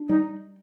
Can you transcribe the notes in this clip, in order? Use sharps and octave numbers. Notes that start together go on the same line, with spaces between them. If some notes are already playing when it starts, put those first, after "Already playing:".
Already playing: D4
G3 D#4